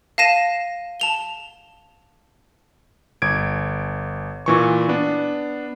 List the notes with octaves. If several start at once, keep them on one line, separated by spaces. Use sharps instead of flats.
F5 A5 A#6 D#7 E7
A5 F7 G7
G1 G#6 D7
A#2 E3 C#6
B3 D4